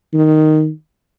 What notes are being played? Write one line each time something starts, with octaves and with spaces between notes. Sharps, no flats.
D#3